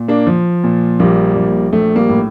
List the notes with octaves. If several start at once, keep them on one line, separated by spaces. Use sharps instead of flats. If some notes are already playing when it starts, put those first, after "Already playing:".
Already playing: A#2
A#3 D4
F3
A#2
A#1 G3 A#3
A#1
A#1 A3
G3 A#3
A2